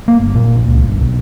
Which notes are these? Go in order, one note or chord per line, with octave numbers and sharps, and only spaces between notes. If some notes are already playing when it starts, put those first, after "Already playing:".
A#3
G1
A#2
A#1
C#2
G1
B1